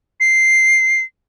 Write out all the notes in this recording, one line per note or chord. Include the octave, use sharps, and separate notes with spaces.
C7